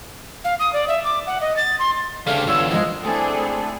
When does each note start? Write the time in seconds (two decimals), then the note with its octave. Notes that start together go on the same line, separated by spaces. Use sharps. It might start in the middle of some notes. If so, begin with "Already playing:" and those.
0.44 F5
0.59 D#6
0.73 D5
0.88 E5
1.04 D6
1.27 F#5
1.41 D#5
1.56 A6
1.79 C6
2.27 D2 C#3 G3 A3 D4 F5
2.47 E2 G2 D3 F4 C#5 E6
2.71 D#3 F3 G#3
3.03 A3 C4 D4 E4 G#4 A4